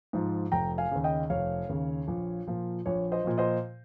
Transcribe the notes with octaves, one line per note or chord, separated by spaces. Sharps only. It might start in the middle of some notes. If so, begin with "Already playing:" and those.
G#2 F3
F1 G5 A#5
F5 G#5
D#2 C#3
D#5 G5
F1 C#5 F5
D#2 C#3
A#1
A#2 F3
A#1 C#5
C5 D#5
A#2 F3
C5 D#5